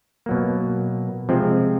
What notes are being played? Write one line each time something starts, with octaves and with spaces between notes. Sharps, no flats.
B2 F#3 A#3
C3 F3 G#3 C4